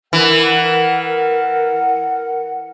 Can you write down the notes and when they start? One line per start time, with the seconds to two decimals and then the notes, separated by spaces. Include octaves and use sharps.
0.13 E3 A#4 F#5